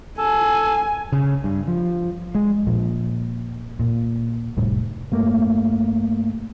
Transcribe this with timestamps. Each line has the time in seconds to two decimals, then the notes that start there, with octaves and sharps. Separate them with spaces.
0.18 A4 G#5
1.12 C#3
1.44 G2
1.68 F3
2.35 G#3
2.67 A#2 F3
3.80 A#2
4.57 F1 A2 G3
5.12 G2 A3 A#3